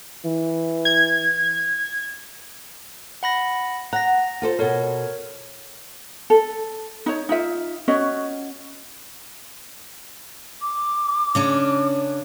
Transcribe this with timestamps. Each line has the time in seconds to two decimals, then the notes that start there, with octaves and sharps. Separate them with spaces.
0.25 E3
0.85 G#6
3.23 F#5 B5 A#6
3.93 F#5 A#5 A#6
4.42 F4 A4 C5
4.59 B2 A4 A#4 C#5
6.30 A4
7.06 D#4 C#5
7.29 D#4 F4 E5
7.88 C#4 F#4 C#5 D#5
10.61 D6
11.35 C#3 C#4 D4